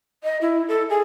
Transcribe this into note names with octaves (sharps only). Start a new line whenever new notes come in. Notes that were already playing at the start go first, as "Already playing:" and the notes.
D#5
E4
A4
G#4